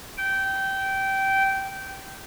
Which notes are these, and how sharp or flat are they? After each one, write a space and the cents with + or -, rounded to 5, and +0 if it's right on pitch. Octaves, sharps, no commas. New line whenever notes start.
G5 -15